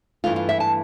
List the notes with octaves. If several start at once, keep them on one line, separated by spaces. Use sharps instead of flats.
G2 E3 A3 F4
F4
E5
A5